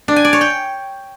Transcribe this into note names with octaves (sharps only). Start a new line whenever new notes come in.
D4
G#5
D5
C#5
G5